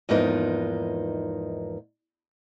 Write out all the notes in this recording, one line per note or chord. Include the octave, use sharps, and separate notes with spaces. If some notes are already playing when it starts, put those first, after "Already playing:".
E2 G#2 F3 A#3 D#4 B4